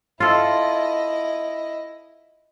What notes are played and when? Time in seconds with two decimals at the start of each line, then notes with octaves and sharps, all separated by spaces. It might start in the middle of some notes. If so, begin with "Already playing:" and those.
0.20 E4 F4 A4 D#5